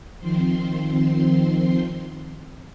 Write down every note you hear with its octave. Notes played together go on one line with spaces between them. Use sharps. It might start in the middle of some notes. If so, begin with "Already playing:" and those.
D#3 F3 C4 C6